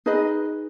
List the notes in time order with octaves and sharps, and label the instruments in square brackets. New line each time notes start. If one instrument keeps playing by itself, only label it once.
[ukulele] D#4 G#4 B4 D#5